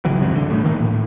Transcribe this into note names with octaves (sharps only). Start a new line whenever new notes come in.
G#1 C#3 E3 F#3
C#2 G2 C3 F#3
C#2 G2 D3
A2
D#3 E3 A#3
A2